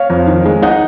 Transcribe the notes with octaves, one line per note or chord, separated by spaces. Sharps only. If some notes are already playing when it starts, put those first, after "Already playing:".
Already playing: C#5 F5
F2
D#3
G#3
D#4 D#5 F#5